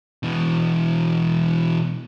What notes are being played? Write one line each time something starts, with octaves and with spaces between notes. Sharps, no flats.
B2 E3